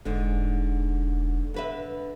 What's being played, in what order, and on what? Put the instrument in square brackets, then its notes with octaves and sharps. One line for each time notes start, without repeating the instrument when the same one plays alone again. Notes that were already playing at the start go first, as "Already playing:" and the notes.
[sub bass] E1 [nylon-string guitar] G#2 D3
[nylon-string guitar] D3 B4 E5